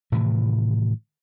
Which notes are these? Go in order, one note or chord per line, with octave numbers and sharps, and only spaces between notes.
A2 C3 D#3 E3